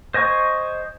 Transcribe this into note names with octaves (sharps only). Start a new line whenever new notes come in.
C5 D#5 G#5 C#6